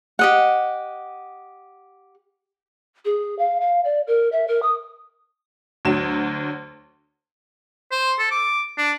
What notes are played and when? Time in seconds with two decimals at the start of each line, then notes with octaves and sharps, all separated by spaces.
0.19 G4 D#5 F#5
3.05 G#4
3.39 F5
3.61 F5
3.85 D5
4.07 A#4
4.32 E5
4.48 A#4
4.62 D#6
5.85 D2 F#3 E7
7.92 C5
8.19 A4
8.31 D6
8.78 D4